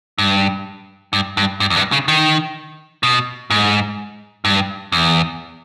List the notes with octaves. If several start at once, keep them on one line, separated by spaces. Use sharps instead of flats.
G2
G2
G2
G2
E2
G2
C#3
D#3
B2
G#2
G2
E2